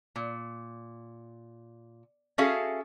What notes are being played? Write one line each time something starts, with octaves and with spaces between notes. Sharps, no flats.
A#2
C#4 F#4 G#4 A4 E5 F5